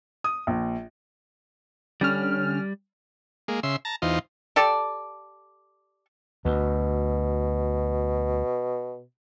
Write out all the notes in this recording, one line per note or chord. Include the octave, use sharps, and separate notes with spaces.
D#6
A#1
D3 G3 C#4 F6
G#3 A#3
C#3 E5 C6
A5 A#5
E2 D#4 F4 C5
G4 A4 D5
D2 B2